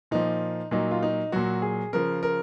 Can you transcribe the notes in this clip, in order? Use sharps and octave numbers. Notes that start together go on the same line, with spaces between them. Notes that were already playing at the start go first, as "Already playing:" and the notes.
A#2 F3 D#4
A#2 F#3 D#4
F4
D#4
A#2 F#3 F#4
G#4
C#3 F3 A#4
A#4